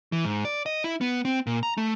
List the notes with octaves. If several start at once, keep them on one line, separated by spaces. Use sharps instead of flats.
E3
G#2
D5
D#5
E4
B3
C4
A#2
A#5
A3